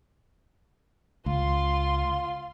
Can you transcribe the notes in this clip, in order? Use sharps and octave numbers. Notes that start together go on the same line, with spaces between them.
C#2 F4 C6